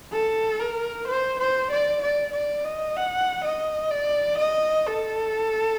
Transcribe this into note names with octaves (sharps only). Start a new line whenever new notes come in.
A4
A#4
C5
C5
D5
D5
D5
D#5
F#5
D#5
D5
D#5
A4